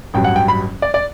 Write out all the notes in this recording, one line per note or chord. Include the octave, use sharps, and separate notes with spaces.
A1 G2 F#3 G5
F#5
G5
B5
D5
D5